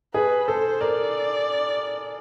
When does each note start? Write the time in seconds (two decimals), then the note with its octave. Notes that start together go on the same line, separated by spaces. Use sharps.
0.14 G#4 B4
0.48 A4 C5
0.81 A#4 D5